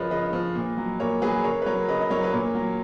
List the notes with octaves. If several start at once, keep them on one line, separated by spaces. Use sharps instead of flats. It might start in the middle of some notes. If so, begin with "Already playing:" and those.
Already playing: C#3 F3 A#4 B4 C#5 D#5
C#3 B4 D#5
F3
A#2
F#3
A#2 A#4 C#5
F#3 G#4 B4
C#3 A#4 C#5
B4
F#3 A#4 C#5
C#3 B4 D#5
D#5
F#3 A#4 C#5
B4
A#2 A#4 C#5
F#3